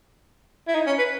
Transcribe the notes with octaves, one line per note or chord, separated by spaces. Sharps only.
E4
D#4
C#4
B4